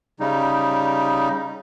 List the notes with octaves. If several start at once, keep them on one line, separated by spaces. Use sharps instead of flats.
C#3 G3 D#4